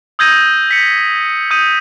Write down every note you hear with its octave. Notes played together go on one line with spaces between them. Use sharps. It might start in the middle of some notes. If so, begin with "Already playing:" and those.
D#6 E6 G6 G#6 A#6 D#7
B6 C#7
D#6 G6 D#7